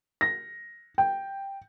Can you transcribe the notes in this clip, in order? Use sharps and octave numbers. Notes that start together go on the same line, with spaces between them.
A#6
G5